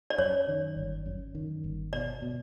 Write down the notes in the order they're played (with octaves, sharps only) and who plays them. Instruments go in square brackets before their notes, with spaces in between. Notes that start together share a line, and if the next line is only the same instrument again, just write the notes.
[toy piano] D5
[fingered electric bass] F#2 [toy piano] C#5
[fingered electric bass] D#3
G1
F#2
D#3
G1
[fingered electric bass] B2 [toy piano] D5
[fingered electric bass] B2